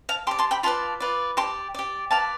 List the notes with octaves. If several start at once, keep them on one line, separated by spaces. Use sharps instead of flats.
F5 A5
G4 D5 A5 C6
A5 C6
G5 B5
F4 B4 D5 A5 C6
F4 B4 D5
G4 D5 A5 C6
G4 D5
G4 B4 D5 F5 A5